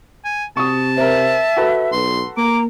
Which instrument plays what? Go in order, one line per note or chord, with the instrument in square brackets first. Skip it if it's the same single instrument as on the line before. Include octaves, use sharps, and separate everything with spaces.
[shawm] G#5
[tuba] C3 [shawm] A5 [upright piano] C#6 D#6
[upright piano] C4 A#4 [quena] E5
[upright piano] F#4 A4 B4
[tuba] B1 [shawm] C6
[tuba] A#3 [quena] A#5 [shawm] D6